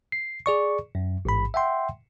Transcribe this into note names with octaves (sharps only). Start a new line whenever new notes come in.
C7
G#4 D5 C#6
F#2
A1 G#2 B5
E5 F#5 G5 C6